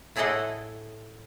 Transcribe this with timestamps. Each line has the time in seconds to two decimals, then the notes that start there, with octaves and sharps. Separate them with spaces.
0.16 A2 E4 G#4 A4 D#5 F#5